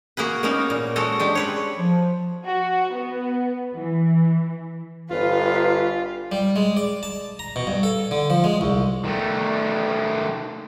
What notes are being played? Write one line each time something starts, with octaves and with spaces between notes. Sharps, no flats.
A#3 F#4 G#4 B4
A#3 B3 C#4 D#4 A#4
A#2
G#3 F#4 A4 C#5 D#5
G#3 D4 G4
C4 B4 C#5
F3
F#4
B3
E3
G1 F4 B4 F5
G3
G#3
D5
A5
A#5
B2
G2
A4
D3
F3
G#3
C2
D#3 A3